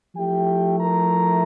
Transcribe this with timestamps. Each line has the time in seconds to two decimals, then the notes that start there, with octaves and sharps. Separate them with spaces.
0.16 F3 A3 E4 G4 G5
0.79 A#4 A#5